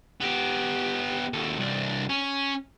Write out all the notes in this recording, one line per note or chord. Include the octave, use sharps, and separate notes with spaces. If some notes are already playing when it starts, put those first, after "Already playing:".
B3 G4
D#2 A4
C2 D4
C#4